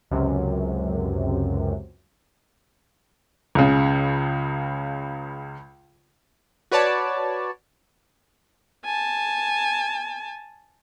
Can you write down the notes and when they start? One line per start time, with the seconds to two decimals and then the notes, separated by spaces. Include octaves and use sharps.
0.11 C#2 F#2 C3
3.55 C#2 C#3
6.71 F#4 B4 C#5 D5 A5
8.85 G#5 A5